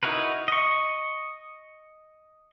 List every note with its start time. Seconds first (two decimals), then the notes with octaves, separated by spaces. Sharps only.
0.03 D#4 E4 F#4 A#4 B4
0.48 D#5 C#6